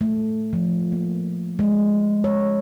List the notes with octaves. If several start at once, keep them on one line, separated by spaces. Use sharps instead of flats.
A3
F3
A#3
G#3
C#5